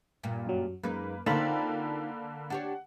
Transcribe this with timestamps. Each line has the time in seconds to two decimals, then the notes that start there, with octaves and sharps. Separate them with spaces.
0.23 G2 A#2
0.46 F#2 F#3
0.83 F#2 G#3 A#3 D#4 B4
1.26 D3 A#3 C4 D#4 F4 A5 B5
2.50 D4 G4 C#5 F#5